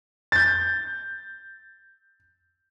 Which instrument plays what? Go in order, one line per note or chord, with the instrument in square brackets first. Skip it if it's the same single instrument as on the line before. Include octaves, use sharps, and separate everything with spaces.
[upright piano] G6 A6